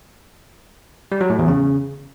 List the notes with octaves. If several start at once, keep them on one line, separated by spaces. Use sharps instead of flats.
G3
F#3
A2
E2
C#3